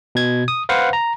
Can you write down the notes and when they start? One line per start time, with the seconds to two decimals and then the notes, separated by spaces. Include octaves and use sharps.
0.15 B2 G#6
0.48 D#6
0.69 B4 C5 F5 F#5
0.93 A#5